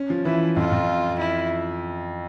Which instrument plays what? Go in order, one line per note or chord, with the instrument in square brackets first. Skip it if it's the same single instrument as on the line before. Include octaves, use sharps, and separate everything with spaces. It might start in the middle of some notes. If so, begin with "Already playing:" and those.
Already playing: [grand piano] C#4
F3
[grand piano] E3 [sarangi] E4
[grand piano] F2 [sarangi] F4
[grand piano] F2
[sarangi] E4